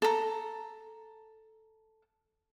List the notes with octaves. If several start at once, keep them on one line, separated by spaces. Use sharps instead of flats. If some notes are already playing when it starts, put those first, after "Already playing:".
A4 A#5